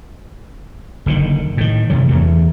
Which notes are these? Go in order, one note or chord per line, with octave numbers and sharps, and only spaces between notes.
F#1 D3 D#3
A2 D#3
F#2 C3 D#3 F#3
E2 E3 A3